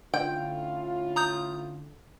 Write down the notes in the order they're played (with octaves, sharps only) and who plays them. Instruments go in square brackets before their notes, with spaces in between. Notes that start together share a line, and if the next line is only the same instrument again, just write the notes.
[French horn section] A2 C#4 F4 [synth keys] D3 [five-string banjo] G5
[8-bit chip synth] A#5 D#6 G6